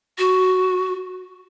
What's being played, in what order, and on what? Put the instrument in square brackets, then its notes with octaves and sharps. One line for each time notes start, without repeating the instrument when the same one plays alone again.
[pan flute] F#4